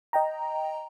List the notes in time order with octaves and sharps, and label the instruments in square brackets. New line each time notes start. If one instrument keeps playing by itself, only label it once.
[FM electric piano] D#5 G5 A#5